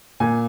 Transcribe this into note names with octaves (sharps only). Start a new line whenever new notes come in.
A#2 G#5